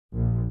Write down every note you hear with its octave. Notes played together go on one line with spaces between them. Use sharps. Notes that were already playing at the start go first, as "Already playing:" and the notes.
A#1